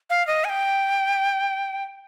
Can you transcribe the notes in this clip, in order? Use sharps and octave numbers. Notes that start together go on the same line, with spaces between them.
F5
D#5
G#5
G5